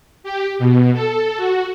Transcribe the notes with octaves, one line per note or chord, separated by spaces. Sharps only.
G4
B2
A4
F#4